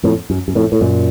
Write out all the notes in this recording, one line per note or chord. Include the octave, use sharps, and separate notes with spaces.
F2 A2
F#2
F#2
F2 A2
A2
F#2 A#2